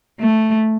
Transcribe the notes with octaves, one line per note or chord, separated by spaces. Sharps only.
A3